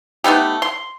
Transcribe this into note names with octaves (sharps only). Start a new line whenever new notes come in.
A3 B3 D#4 G4
C6